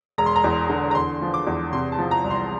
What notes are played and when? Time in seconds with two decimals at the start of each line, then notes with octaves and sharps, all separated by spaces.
0.18 E1 A#5
0.26 C6
0.36 A#5
0.44 E2
0.70 D3
0.91 A#5
0.95 E2 C6
1.22 F3
1.34 D6
1.47 E2
1.73 C3 C6
1.92 A5
1.99 F3
2.11 A#5
2.24 C2
2.30 C6